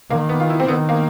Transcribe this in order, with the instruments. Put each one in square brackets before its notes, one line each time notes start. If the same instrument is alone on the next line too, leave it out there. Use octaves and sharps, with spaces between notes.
[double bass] D#3 [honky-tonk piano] A#3
[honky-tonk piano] B3
F4
E4
C4
[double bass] D#3 [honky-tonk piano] B3
[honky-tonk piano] A#3